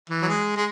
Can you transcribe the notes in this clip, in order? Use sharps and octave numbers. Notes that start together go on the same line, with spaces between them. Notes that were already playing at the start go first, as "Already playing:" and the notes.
E3
F#3
G#3
G#3